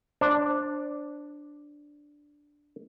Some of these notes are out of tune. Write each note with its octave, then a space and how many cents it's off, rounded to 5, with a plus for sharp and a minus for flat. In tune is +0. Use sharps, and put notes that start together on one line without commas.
D4 +0 C5 +20